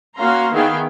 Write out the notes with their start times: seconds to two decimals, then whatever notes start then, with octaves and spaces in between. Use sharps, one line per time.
0.16 A#3 C#4 F#4 F5 A#5 C6
0.51 D#3 B3 E4 G#4 F5 G5